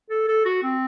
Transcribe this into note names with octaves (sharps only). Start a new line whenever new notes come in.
A4
A4
F#4
C4